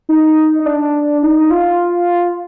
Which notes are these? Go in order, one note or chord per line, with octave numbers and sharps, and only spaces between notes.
D#4
D#4
D4
D#4
F4